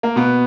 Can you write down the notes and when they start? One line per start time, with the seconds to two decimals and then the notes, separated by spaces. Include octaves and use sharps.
0.03 A#3
0.16 B2 B3